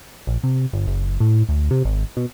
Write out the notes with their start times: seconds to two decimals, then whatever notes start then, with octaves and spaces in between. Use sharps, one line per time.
0.27 A#1
0.43 C3
0.73 G1
0.87 F#1
1.20 A2
1.49 D2
1.71 C3
1.85 G#1
2.17 B2